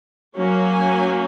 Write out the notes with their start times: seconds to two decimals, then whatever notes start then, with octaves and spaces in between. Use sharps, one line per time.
0.36 F#3 A#3 C#4
0.70 G#5